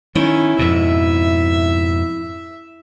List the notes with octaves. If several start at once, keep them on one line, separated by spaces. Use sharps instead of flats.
D#3 C#4 E4
F2 G#2 B2 E5